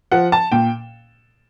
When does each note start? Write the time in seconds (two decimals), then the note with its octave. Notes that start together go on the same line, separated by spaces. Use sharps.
0.12 F3 F#5
0.32 A5
0.52 A#2 G5